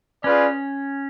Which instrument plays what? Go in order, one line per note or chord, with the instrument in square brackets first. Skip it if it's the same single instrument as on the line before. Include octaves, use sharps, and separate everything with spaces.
[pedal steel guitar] C#4 [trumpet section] F4 G#4 B4 D5